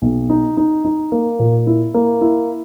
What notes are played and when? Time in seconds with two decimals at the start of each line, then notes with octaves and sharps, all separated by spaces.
0.02 B1
0.30 D#4
0.57 D#4
0.85 D#4
1.12 A#3
1.39 A#2
1.67 E4
1.94 A#3
2.21 E4